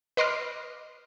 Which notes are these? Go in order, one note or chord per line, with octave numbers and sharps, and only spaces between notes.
B4 D#5 C6 D6 F6